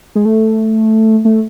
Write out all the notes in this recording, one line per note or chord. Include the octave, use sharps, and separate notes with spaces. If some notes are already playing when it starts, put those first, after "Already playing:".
G#3
A3
A3